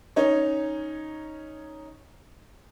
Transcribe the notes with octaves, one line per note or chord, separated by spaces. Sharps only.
C#4 D#4 C#5